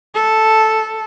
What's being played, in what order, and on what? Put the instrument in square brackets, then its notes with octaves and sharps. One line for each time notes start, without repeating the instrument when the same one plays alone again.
[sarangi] A4